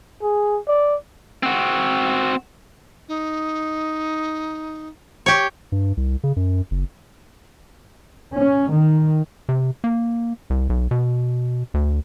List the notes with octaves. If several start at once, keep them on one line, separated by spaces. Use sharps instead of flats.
G#4
D5
C4 F#4
D#4
G4 C#5 C#6
G2
C2
C#3
F#2
F#1
C#4
D#3
C3
A#3
C2
B1
B2
D2